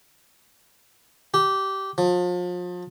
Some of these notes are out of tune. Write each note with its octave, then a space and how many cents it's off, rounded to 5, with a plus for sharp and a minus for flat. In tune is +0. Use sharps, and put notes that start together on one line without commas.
G4 -15
F3 +35